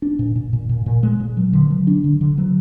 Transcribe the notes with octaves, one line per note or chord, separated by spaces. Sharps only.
D4
A#2
A#2
A#2
A#2
A#2
G#3
A#2
F#3
D3
F#3
D4
D3
D3
F#3